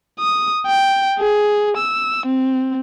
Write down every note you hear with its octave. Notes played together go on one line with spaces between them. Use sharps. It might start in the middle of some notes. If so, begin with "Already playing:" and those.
D#6
G5
G#4
E6
C4